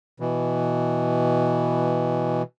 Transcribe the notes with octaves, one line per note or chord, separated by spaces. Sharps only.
B2 E3